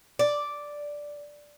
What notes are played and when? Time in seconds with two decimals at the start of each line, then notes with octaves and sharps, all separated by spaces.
0.19 D5